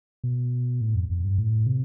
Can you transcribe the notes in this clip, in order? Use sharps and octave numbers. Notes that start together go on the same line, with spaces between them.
B2
A2
F2
F2
G2
A2
C3